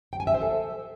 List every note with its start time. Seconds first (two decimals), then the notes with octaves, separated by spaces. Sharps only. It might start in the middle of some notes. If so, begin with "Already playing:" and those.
0.13 G5
0.20 G#5
0.27 E5
0.34 C5
0.41 A4